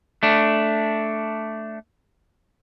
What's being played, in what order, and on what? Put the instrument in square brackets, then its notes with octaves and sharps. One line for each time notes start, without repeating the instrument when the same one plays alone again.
[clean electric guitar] A3 D4